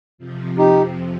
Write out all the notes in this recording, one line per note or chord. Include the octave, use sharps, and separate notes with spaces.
F2 C3 F3
D#4 G4